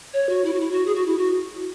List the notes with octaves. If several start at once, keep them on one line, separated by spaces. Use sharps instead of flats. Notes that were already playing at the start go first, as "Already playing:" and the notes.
C#5
F#4
E4
F#4
E4
F#4
G#4
F#4
E4
F#4